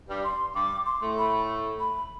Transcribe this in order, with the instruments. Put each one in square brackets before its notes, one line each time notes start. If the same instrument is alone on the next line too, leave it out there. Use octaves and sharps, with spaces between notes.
[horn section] G2 G3
[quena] C6
[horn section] G2 G3 [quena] D6
[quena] C6
[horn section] A2 A3
[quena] B5
B5